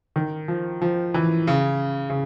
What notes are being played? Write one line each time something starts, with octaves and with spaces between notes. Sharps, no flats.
D#3
F3
F3
E3
C#3
C#3